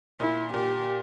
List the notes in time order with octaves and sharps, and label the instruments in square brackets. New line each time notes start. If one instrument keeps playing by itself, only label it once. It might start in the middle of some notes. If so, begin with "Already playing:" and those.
[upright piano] A#2 [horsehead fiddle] E4
[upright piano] A#2 [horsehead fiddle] G4